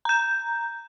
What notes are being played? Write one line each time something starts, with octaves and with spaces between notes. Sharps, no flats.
A#5 G6